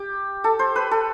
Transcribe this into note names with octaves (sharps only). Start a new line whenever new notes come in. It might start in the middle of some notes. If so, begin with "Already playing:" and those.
Already playing: G4
A4
C5
B4
A4